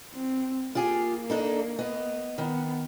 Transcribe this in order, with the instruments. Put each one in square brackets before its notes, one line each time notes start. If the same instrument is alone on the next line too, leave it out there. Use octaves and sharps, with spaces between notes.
[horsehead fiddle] C4
[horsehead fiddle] A#3 [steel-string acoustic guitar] F4 G4 G#4
[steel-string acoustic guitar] D4 D#4 A4
B3 D#5
[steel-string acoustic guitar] D#3 [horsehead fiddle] B3